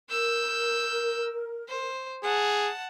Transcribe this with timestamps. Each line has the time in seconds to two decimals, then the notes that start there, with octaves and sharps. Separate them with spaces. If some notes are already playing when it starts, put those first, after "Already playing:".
0.10 A#4 E6 G6
1.69 C5
2.24 G#4 F#5 A5